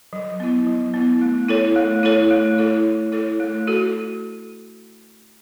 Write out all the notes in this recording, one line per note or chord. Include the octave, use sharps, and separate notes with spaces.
F#3
B3 E4
F#3
B3 E4
A3
E4 A4 C#5
A3
E4 A4 C#5
A3
E4 A4 C#5
A3
E4 A4 C#5
A3
F#4 A4